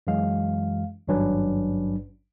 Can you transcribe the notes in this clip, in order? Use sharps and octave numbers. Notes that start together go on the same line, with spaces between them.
F#2 E3 G#3 F5
G#1 G2 F#3 C#4 D4 B4